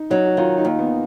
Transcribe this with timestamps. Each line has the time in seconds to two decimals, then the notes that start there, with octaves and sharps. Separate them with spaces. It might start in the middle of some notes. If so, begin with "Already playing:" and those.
Already playing: D#4
0.10 F#3 D#4
0.26 F#4
0.37 D#3 F4
0.58 D#4
0.65 D#2
0.79 B3